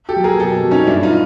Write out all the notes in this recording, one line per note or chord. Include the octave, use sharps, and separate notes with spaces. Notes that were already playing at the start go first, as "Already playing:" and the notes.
G4 A4
F#3
G#4 A#4
B2 G4 A4
F#3
C#4 D#4
G2 D4 E4
D#4 F4